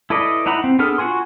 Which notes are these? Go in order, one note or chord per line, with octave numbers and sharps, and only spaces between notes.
E4 A4 B4 D5 D#5
D#4 E4 F#5 A#5 B5
C4
B3 D4 G#4 A4 F6
F4 F#4 F#5 G#5 C6